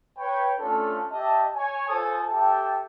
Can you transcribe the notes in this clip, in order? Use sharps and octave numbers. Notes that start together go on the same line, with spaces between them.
B4 C#5 G5
A3 C#4 D4 F4 A4
G4 D#5 E5 A5
C#5 G#5
F4 A4 C5 G#5 A5 D#6
G4 A4 E5 G5 A5